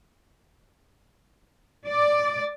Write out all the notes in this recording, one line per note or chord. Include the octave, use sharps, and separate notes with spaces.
D5